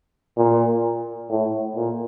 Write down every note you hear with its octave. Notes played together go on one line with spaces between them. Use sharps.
A#2
A2
A#2